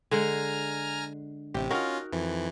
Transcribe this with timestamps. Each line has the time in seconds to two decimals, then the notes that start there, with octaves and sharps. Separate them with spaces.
0.11 D3 G#3 G#5 A#5 F6
1.54 A1 C3 G4
1.71 C#4 D#4 F4 F#4 A#4
2.13 F2 E3